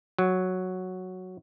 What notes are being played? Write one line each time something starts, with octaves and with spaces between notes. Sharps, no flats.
F#3